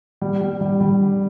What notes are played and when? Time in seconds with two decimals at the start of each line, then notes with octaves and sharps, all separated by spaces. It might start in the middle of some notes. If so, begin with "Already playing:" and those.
0.21 G3
0.41 G3
0.61 G3
0.81 G3